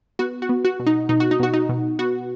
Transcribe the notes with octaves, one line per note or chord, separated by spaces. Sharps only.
B3 F#4
F#4
B3
F#4
B2
D#4
B2 D#4
F#4
D#4
B2 F#4
D#4
B2
B3 F#4